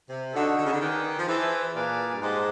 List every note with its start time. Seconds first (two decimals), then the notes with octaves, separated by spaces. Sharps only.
0.09 C3
0.33 D3 D#4 F#4 A4
0.57 D3
0.65 C#3
0.72 D3
0.80 D#3 G#4 B4 D5 G5
1.18 F3
1.27 E3 G#4 C5 E5 A5
1.75 A#2 G#4 B4 D5 F5 A5
2.12 G2
2.21 G#2 G4 C5 D#5 F#5 A5